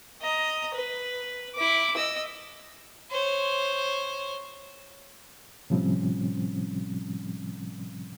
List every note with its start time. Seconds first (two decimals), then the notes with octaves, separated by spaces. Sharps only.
0.22 D#5 A#5
0.75 B4
1.56 E4 D6
1.96 D#5 E6
3.11 C5 C#5
5.70 A2 C3 F3 G3 C4 C#4